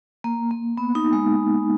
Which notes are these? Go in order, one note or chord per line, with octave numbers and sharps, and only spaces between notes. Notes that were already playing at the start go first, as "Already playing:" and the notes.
A#3
A#3
B3
D#4
G#3